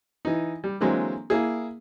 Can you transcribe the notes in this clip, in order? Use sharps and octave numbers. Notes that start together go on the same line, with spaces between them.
E3 D#4
G3
D3 E3 F#3 G#3 A#3 C4
A#3 E4 G#4